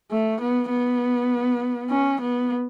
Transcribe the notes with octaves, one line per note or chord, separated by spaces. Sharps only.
A3
B3
B3
C#4
B3